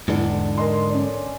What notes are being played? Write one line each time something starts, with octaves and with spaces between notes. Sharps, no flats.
E2 G#2 D3 D4
A#4 D#5 C6
C#4 D5